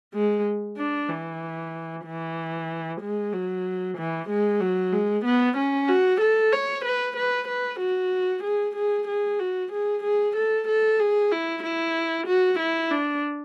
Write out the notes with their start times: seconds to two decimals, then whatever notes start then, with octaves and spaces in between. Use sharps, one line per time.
0.14 G#3
0.78 D4
1.09 E3
2.06 E3
3.01 G#3
3.33 F#3
3.98 E3
4.29 G#3
4.61 F#3
4.92 G#3
5.25 B3
5.57 C#4
5.88 F#4
6.21 A4
6.52 C#5
6.85 B4
7.17 B4
7.48 B4
7.80 F#4
8.44 G#4
8.76 G#4
9.08 G#4
9.39 F#4
9.72 G#4
10.04 G#4
10.36 A4
10.68 A4
11.00 G#4
11.32 E4
11.63 E4
12.27 F#4
12.59 E4
12.91 D4